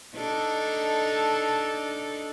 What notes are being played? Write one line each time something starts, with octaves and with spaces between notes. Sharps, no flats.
D4 D#4 A4